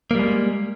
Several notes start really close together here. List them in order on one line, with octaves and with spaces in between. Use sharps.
A#3 G3 G#3